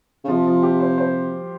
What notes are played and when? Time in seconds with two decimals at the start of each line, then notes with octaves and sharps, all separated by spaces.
0.24 C#3
0.28 C3 F3
0.46 F3
0.63 G4
0.80 C5
0.98 C5